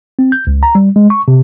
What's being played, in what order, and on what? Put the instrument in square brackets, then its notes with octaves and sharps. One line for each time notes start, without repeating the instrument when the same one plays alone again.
[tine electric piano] C4
G6
C#2
A#5
G3
G#3
C#6
C3